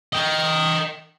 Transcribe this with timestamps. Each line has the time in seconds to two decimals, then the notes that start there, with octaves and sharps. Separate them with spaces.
0.13 D#5 G5